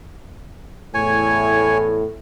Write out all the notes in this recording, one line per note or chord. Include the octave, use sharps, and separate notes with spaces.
E2 A2 C#5 G#5